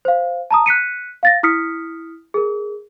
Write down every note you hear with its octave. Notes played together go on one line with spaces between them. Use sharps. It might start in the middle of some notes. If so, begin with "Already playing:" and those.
C5 F5
A5 A#5 D#6
F#6 B6 C#7 D#7
F5 A6 A#6
E4 D#6 F6 B6 C#7
G#4 A#4